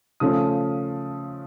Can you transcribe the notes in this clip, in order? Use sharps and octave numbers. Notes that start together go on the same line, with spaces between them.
C#3 F3 A3 C#4 D#6